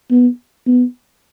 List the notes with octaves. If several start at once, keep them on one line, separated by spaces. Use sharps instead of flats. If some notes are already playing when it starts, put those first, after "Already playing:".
B3
B3